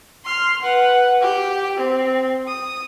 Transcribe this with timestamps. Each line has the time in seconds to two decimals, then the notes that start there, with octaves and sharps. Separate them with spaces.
0.25 C6 F6
0.62 B4 F#5
1.21 G4 G5
1.78 C4
2.48 D#6